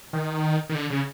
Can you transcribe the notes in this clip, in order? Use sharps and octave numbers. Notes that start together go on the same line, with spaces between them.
D#3
D#3
D3
C#3